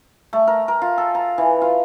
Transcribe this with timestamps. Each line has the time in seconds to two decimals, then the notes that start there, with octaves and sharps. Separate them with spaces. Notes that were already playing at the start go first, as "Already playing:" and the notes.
0.33 A3
0.47 A#4
0.68 A#4
0.82 F4
0.98 A4
1.15 A#5
1.38 E3
1.62 F4